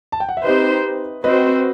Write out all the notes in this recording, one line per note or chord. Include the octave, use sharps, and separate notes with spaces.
A5
G5
F#5
E5
C4 D#4 G4 B4 C5 D#5
C4 F#4 B4 C5 D#5